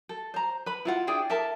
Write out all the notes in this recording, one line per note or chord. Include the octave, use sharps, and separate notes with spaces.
A4
C5 A#5
B4 B5
E4 F4 F#5
D4 E4 G#4 G5
A4 A#4 E5 A5